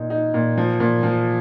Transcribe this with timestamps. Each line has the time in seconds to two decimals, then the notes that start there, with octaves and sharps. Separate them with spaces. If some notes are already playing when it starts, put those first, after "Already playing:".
Already playing: A#2 D#4
0.10 D#4
0.34 A#2
0.58 F3
0.80 A#2
1.03 F3